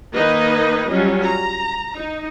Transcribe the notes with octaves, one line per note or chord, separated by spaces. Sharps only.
D#3 A#3 D#4 B4 D#5
F#3 G3 C#4 F4
A#5
D#4